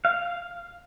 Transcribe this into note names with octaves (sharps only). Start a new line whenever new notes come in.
F5